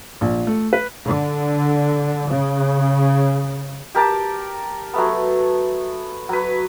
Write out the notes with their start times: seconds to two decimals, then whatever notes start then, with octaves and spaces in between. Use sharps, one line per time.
0.21 A#1
0.47 A3
0.73 B4
1.06 D3
2.27 C#3
3.95 G4 A#4 A5
4.94 F#3 A3 B3
6.29 F#3 B4